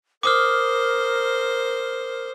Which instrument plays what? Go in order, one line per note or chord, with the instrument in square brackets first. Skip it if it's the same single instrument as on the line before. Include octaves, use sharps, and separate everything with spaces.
[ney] A#4 [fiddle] C5 [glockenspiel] D6 D#6 F6